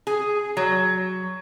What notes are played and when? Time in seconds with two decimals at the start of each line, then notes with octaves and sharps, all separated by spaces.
0.07 G#4
0.57 F#3